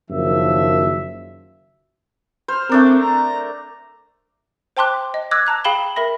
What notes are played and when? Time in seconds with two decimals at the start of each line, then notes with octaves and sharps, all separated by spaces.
0.10 F#1 F#2 D#3 F3 E5
2.48 C5 F6
2.69 A3 C4 D4 A#4
3.01 A#5
4.77 C5 G5 A5 C6 D6 F#6
5.14 D#5
5.31 D6 E6 F#6 G#6 A#6
5.46 A5 A#5 F#6
5.65 G#4 F5 G5 B5 E7 G7
5.96 A#4 E5 B5 A#6